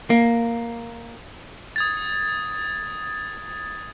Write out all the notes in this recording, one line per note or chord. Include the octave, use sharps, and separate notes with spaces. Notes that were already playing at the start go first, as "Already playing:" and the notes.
A#3
D#6 G#6 A6